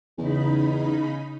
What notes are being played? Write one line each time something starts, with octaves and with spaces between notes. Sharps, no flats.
E2 C#3 D#4 B5